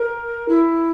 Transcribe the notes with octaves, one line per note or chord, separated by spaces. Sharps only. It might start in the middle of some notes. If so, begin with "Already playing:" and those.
Already playing: A#4
E4